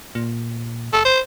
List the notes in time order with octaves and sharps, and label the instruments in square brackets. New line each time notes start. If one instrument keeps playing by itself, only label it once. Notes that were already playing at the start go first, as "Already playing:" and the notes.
[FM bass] A#2
[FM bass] F#1 [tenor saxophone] A4
[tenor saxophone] C5